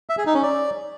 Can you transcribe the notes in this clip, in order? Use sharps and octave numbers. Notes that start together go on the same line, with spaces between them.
E5
G#4
D#4
C#4
D5